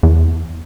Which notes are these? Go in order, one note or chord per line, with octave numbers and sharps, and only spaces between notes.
E2